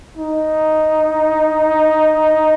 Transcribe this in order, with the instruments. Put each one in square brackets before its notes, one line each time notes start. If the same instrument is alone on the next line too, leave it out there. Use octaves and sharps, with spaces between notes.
[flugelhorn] D#4